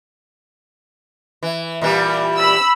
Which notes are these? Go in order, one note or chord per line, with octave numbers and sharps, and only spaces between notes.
E3
A#2 E3 G3
B5 E6